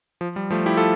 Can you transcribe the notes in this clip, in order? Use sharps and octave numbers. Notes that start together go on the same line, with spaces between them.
F3
G3
F3 A3
E4 G4
F4 A4